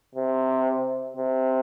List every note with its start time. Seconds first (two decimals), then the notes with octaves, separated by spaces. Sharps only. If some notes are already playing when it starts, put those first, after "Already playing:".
0.15 C3
1.17 C3